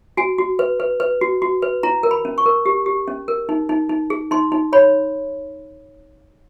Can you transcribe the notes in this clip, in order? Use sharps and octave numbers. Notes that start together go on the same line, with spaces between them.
F#4 G#5
F#4
B4
B4
B4
F#4
F#4
B4
E4 A#5
A#4
B5
C#4
C#6
A#4
G4
G4
C#4
A#4
D#4
D#4
D#4
G#4
D#4 C6
D#4
C#5 B5